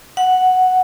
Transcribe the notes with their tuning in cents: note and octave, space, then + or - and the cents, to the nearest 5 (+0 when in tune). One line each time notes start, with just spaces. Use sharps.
F#5 +0